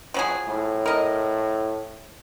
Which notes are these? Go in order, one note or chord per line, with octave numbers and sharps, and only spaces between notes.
F3 F#3 G#4
A2
A#4 D#5